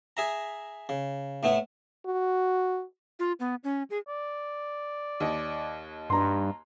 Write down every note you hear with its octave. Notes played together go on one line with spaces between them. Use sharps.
G#4 E5 A#5
C#3
A2 A3 B3 E4
F#4
F4
B3
C#4
G#4
D5
D#2 D#5
G2 A#5 C6